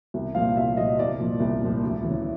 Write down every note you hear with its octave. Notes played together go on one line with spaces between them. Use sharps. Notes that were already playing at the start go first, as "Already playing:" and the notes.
C2
A#2 F3 F5
C2 E5
A#2 F3 D#5
C2 D5
A#2 F3
C2
A#2 F3
D2
C#3 E3